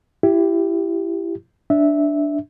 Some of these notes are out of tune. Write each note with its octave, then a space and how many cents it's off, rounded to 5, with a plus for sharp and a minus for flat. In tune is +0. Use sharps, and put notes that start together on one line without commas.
E4 +25 G4 +0
D4 +0 E5 -10